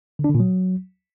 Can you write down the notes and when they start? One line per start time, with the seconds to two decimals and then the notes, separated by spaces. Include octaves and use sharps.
0.19 D3
0.24 D4
0.30 D3
0.35 A#2
0.40 F#3